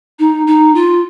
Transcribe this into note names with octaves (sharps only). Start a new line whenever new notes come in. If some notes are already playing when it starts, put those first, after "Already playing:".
D#4
D#4
F4